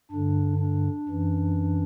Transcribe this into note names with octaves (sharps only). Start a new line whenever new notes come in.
G2 D3 D4
D4
F#2 E3